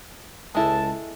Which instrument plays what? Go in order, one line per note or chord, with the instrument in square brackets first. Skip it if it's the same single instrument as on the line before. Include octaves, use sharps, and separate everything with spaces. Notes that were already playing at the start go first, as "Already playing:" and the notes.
[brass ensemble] C#2 A5 [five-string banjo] G#3 E4 A4